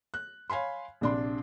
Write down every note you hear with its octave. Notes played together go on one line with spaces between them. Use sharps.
F#6
C#5 F5 G#5 B5 C6
A#1 C3 D4 D5 C6